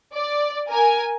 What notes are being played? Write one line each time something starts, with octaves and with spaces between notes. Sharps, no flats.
D5
A#4 G#5